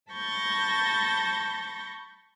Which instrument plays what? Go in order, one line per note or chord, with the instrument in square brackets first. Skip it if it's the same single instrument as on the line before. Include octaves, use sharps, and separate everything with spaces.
[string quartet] A5 B5 C#6 G6 A6 A#6